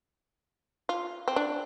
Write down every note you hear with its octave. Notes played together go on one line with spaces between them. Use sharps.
F4
C4
D4